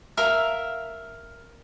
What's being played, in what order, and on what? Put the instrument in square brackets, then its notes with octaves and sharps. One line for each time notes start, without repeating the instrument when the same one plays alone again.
[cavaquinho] A#4 E5 F5